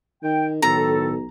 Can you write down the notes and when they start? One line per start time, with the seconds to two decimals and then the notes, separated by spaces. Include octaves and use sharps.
0.23 D#3 G5
0.62 B1 A2 D#3 A4 A#5